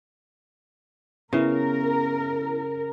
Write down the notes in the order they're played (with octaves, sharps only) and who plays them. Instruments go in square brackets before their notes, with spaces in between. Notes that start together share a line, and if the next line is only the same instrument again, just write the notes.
[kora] C#3 [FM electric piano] B3 E4 [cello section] A#4